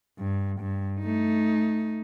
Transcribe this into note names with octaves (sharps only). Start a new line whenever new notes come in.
G2
G2
A3 D#4